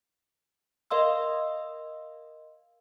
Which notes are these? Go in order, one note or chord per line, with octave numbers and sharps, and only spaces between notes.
A#4 D#5 F5 C6 E6